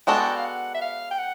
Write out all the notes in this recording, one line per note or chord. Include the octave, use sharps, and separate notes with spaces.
G#3 B3 D4 F#4 A4 G5
F5
F#5
E5
F5
G5
F#5